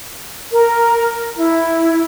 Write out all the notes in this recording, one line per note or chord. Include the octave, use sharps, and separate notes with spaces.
A#4
E4